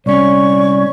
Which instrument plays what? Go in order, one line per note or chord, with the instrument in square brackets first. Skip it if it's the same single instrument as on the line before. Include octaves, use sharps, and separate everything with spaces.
[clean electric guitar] C2 C#4 [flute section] C#5 D5 C#6